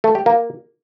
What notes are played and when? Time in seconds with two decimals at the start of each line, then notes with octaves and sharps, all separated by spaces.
0.04 A3
0.15 G4
0.26 A#3